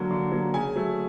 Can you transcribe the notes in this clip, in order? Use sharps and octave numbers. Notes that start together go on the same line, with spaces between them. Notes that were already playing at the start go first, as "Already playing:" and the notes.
Already playing: D3 F#3 A#3
D3
F#3 A#3
C#3 G#5
F#3 A3